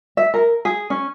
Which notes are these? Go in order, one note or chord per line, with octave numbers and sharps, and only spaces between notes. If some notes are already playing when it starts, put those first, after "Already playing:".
E5
A#4
G#4
C#4